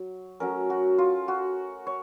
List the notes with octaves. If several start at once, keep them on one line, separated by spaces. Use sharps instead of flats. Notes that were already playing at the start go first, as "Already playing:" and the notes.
Already playing: F#3
F#3 A3 C#4 A#4
F#4
F4
F#4
C#5